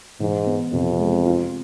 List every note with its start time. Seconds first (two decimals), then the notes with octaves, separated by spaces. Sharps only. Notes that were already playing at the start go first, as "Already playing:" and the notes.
0.20 G#2 E3
0.46 B3
0.73 F2 C3
0.99 G#3
1.26 F4